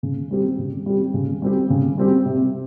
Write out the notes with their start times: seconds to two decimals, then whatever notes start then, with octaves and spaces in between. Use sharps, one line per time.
0.03 C#3
0.31 G3 C4 G4
0.59 C#3
0.86 G3 C4 G4
1.14 C#3
1.42 G3 C4 G4
1.70 C#3
1.98 G3 C4 G4
2.25 C3